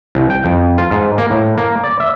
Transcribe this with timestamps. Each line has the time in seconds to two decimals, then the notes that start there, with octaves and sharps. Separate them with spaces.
0.15 C2
0.30 G5
0.45 F2
0.78 F4
0.91 G#2
1.18 A#3
1.30 A2
1.58 A#3
1.84 D5
2.00 E5